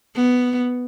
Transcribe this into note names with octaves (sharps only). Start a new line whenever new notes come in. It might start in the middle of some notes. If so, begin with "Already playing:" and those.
B3